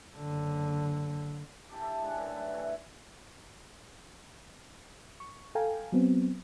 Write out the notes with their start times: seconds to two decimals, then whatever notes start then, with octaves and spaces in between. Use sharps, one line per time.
0.17 F#1 D3
1.69 E4 G4 A5 D6
1.81 A4 E5
2.01 G#3 D4 C#5
2.17 F#2 E3 G3 A3
2.36 B4
2.53 E3 A3 C#5
5.20 C#6
5.55 A4 F5 G5 G#5 A#5
5.92 F#3 B3 C4